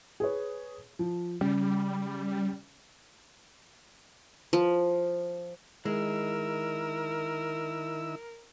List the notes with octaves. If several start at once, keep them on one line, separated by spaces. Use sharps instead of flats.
G#4 B4 C#5
F3
C#3 G3
F3
D#3 G#3 E4 A#4 E6